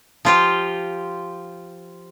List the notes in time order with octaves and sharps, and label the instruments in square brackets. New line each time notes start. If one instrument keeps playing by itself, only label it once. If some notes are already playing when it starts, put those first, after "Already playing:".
[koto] F3 F4 G4